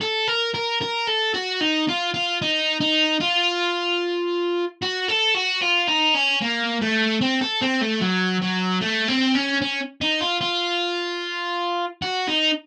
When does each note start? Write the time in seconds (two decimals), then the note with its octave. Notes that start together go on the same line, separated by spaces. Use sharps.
0.01 A4
0.27 A#4
0.54 A#4
0.82 A#4
1.08 A4
1.34 F#4
1.61 D#4
1.88 F4
2.14 F4
2.42 D#4
2.81 D#4
3.21 F4
4.82 F#4
5.08 A4
5.35 F#4
5.61 F4
5.87 D#4
6.14 C#4
6.41 A#3
6.82 A3
7.21 C4
7.41 A4
7.61 C4
7.81 A3
8.01 F#3
8.42 F#3
8.81 A3
9.08 C4
9.35 C#4
9.61 C#4
10.01 D#4
10.21 F4
10.41 F4
12.02 F#4
12.28 D#4